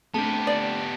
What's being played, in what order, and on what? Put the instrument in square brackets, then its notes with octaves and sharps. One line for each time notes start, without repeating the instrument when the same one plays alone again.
[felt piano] A3 C4 D4 [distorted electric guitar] B3 G4 [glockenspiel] A5
[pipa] D5